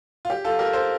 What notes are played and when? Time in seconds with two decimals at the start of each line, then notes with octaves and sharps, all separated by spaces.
0.25 F4
0.30 G4
0.44 F4 A4
0.59 G4 A#4
0.73 A4 C5